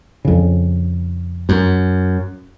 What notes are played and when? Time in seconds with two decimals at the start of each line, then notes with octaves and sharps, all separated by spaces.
0.25 F2 C#3
1.49 F#2